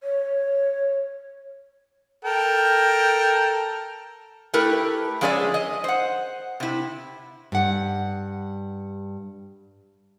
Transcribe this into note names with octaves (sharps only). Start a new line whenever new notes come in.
C#5
A4 A#4 G5
A3 E4 G4 A#4 B4
F3 G#3 C#4 G#4 D5 E5
D#5
C5 F#5
C3 E4
G2 F#5